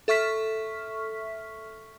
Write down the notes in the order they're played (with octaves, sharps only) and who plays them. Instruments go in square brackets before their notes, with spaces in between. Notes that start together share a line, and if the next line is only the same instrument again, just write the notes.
[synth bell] A4 E5 C#6 F6 B6